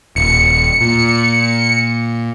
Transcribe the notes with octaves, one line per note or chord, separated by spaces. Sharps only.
D#1 C#7
A#2